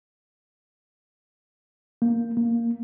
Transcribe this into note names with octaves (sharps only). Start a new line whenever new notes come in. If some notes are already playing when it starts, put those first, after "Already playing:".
A#3
A#3